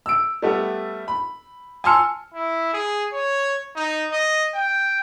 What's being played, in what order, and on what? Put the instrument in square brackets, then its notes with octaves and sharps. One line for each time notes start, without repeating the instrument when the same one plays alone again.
[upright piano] E6 D7
G3 A3 B3
B5
G#5 A5 C6 E6 F6 C#7
[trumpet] E4
G#4
C#5
D#4
D#5
G5